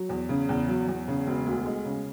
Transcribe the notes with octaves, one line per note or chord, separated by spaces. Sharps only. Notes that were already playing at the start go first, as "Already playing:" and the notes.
Already playing: F#3
E2
C#3
E2
F#3
E2
C#3
E1
D2
G#3
C#3